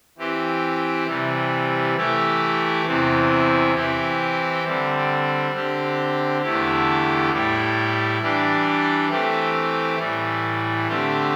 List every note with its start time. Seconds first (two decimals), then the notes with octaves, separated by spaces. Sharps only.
0.18 E3 C4 G4
1.07 C3 E3 G3
1.97 E3 A3 E4 G4
2.86 E2 C3 E3 C4 E4
3.75 E3 C4 E4 G4
4.64 D3 G3 C4
5.52 D3 C4 G4
6.42 E2 D3 A3 E4 G4
7.31 A2 G3 E4 G4
8.20 E3 G3 D4 G4
9.10 E3 A3 C4 G4
9.98 A2 E3 G3
10.87 D3 A3 C4 G4